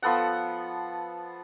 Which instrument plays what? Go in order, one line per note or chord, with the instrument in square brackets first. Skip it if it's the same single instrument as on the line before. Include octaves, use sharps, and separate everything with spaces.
[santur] F3 B3 A4 F#5